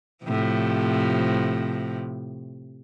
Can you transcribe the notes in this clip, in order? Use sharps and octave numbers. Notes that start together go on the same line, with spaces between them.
A2 C3 F3